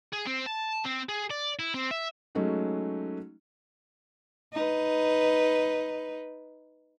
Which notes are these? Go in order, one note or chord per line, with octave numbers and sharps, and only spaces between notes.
G#4
C4
A5
C4
G#4
D5
E4
C4
E5
F#3 G#3 A3 C#4 D#4 F#4
D#4 B4